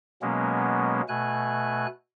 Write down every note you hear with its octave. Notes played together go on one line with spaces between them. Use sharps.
B2 F#3 G#3 A#3 B3 C#4
B2 A3 G#5 F#6